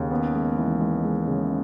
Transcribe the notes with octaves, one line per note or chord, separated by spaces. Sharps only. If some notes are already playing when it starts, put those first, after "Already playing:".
Already playing: D#2 C#3
B3
G#3
E3
G#3
G#3
C#3